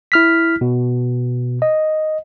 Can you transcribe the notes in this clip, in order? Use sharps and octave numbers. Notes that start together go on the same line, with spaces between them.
E4 F6 B6
B2
D#5